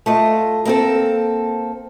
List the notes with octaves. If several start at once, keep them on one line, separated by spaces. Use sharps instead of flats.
A3 F4 D#5
A#3 C4 A4